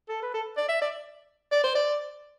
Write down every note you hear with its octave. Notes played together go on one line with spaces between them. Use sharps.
A4
B4
A4
D5
E5
D5
D5
C5
D5